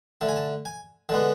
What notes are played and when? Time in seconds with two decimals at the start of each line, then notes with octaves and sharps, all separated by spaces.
0.21 D3 A3 A5
0.29 G#5
0.36 A5
0.65 G#5
1.09 D3 G#3 B3 A5